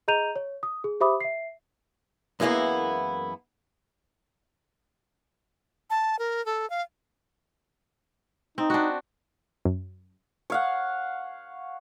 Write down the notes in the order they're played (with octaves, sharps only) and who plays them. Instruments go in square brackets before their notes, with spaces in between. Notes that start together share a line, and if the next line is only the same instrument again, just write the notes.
[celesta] G#4 D#5 A#5 G6 D#7 F7
C#5
D#6
G#4
G4 C5 E5 B5 D6 D#6
E5 C7
[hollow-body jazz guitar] F#2 E3 G#3 A#3 B3 E4
[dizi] A5
A#4
A4
F5
[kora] C4 [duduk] D#4
[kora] D4 F#4
[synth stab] F#2
[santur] C#5 F5 F#5